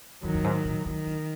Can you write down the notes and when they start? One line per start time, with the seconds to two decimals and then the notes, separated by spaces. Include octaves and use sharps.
0.23 F#2 D#3 F#3
0.34 F#2
0.44 G#2
0.65 A#2
0.86 D3 D#3
1.07 D3